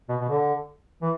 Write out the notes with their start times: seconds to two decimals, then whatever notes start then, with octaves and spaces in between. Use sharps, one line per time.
0.09 B2
0.21 B2
0.29 D3
1.02 E3